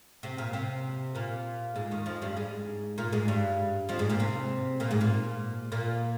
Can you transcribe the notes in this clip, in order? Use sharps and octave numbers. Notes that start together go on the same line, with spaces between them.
C3 C4
A#2 A#3
C3 C4
A#2 A#3
G#2 G#3
D#2 D#3
F2 F3
G2 G3
G#2 G#3
A#2 A#3
G#2 G#3
G2 G3
F2 F3
G#2 G#3
A#2 A#3
C3 C4
A#2 A#3
G#2 G#3
A#2 A#3
A#2 A#3